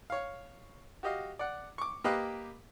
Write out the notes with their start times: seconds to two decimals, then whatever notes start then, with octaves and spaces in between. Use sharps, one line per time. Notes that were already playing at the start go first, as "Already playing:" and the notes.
0.10 C#5 F5
1.03 F#4 G4 D#5 F5
1.39 D5 F#5
1.78 C#6 D6
2.04 A#3 G4 B4 D#5 F5 F#6